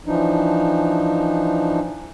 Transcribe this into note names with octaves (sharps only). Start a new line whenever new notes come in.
E3 F3 D4 D#4